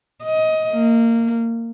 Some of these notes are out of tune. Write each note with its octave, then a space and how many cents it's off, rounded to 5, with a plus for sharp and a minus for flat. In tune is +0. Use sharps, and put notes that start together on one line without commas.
D#5 +20
A#3 -20